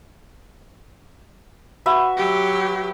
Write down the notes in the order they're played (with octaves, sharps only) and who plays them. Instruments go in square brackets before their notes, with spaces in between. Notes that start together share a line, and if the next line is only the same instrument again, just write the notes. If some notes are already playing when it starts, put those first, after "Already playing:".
[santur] F#4 B4 E5
[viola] F#3 G4